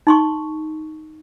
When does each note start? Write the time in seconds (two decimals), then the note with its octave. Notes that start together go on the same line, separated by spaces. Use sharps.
0.07 D#4 C6 C#6